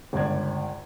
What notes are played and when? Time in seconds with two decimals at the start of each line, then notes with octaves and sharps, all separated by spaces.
0.13 G1 C#2 D5 G#6